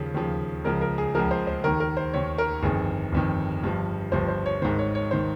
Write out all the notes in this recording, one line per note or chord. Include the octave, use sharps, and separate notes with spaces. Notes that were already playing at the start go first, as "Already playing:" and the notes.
Already playing: D#2 C#3 F3
D#2 C#3 F3
C#2 C#3 F3 A#4
A#4
G#4
C#2 C#3 F3 A#4
C5
C5
D#2 D#3 A#4
A#4
C5
D#2 D#3 C#5
A#4
G1 F2 D#3 G#4
G1 F2 D#3
G1 G2 F3
G1 G2 F3 C5
C5
C#5
G#1 G#2 D#3 C5
C#5
C#5
D#3 C5